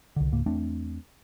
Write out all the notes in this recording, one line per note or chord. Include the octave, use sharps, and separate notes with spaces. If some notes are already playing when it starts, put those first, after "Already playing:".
C2 D3
C#2 G#2 A#3
E2 A3 C4 D4